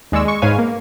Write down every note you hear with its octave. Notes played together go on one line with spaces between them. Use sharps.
D#2 G#3 D5 C#6 E6
G#3 C#6
G#2 G#3 B4 C#5 F5 G#5
A#3